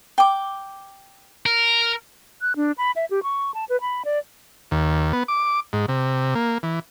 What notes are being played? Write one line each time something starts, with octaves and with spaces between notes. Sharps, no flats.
G5 D6
A#4
F#6
D4
B5
E5
G4
C#6
A5
B4
B5
D5
D#2
B3
D6
G#2
C3
A#3
E3